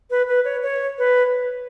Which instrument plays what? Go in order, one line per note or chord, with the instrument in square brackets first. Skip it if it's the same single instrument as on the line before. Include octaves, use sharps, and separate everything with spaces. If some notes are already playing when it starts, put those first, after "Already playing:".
[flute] B4
B4
C#5
C#5
B4